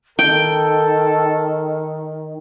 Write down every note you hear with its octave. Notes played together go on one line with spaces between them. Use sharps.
D#3 A4 G5